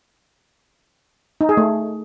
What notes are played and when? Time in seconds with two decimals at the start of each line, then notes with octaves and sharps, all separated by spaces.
1.41 D#4
1.49 G#4
1.57 A3